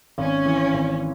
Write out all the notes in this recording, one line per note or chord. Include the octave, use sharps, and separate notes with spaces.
G#1 C#4
E3
G#1